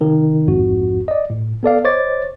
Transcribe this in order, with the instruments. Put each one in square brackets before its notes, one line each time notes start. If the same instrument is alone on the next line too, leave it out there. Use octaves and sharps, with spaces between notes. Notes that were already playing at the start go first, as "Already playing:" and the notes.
[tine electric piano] C3 D#3
A#1 F2 G#2 F#4
D5 D#5
A2
B3 A4 D5 F5
C5 C#5 D#5 D6 A6